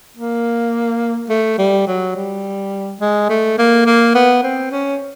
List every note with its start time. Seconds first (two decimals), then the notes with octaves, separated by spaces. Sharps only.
0.17 A#3
1.29 A3
1.58 G3
1.87 F#3
2.16 G3
3.01 G#3
3.29 A3
3.58 A#3
3.86 A#3
4.15 B3
4.43 C4
4.71 C#4